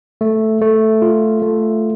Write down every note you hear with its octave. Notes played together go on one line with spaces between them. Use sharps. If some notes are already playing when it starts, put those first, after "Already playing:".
A3
A3
F4
A3